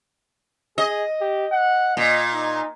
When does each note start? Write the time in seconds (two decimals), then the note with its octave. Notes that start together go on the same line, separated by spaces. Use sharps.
0.78 G#4 D#5
1.21 G4
1.52 F#5
1.97 A#2 D#5
2.33 D#4